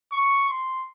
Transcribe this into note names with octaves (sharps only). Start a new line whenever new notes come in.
C#6
C6